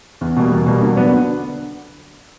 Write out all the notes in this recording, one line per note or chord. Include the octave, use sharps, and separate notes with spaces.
E2
B2 G3 A#3
E2
B2 G3 A#3
D3
F#3 B3 D4
D3